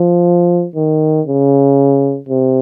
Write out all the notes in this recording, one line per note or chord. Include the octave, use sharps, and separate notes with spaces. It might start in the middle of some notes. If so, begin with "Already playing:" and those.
Already playing: F3
D#3
C#3
C3